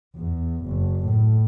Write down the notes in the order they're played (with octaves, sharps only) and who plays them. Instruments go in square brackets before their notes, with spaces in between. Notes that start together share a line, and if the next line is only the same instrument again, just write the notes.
[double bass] E2
F#1
A2